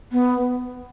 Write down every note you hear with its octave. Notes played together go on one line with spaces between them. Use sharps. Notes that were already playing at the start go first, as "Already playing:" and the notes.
B3